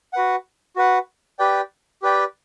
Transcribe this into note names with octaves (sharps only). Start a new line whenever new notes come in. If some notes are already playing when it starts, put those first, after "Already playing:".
F#4 B4 F#5
F#4 B4 F#5
G4 B4 D5 G5
G4 B4 D5 G5